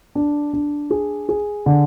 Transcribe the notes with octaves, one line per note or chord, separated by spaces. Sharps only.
D4
D4
G#4
G#4
D3